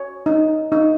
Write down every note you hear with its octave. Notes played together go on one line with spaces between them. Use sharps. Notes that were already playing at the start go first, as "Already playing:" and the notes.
Already playing: C#5
D#4
D#4